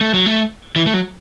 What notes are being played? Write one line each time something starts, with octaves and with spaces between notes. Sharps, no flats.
A3
F#3
A3
E3
A3
F#3